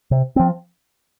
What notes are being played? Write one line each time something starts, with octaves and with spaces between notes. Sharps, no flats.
C3
F3 C4